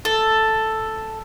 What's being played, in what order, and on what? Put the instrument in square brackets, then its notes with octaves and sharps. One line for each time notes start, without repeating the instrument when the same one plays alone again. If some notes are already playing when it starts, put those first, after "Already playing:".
[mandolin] A4